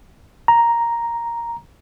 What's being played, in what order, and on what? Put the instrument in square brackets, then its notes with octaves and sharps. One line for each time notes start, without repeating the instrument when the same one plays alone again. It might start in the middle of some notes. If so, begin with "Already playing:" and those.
[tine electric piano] A#5